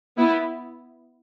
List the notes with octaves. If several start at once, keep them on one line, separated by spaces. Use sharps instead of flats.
B3 E4